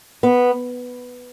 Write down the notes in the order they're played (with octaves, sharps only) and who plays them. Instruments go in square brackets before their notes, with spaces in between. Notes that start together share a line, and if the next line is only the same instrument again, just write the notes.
[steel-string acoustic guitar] B3